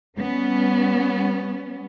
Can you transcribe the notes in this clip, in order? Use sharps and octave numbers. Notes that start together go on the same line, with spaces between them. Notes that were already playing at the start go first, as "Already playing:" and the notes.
G3 B3 C#4